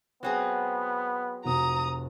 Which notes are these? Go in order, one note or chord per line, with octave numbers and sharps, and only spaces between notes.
F#3 B3 C4 G#4
F1 F#4 A#5 D#6